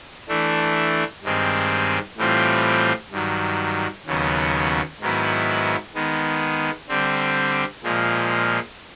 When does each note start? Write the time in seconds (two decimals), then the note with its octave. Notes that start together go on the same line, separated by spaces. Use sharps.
0.28 E3 A3 D4
1.23 G2 D#3 G#3 C4
2.17 A2 E3 G3 C4 F4
3.11 G2 D#3 F#3
4.06 D#2 C#3 F#3 B3
5.01 G#2 D#3 F#3 B3 E4
5.95 D#3 G#3 B3
6.89 D3 G3 C4
7.83 A#2 F3 G#3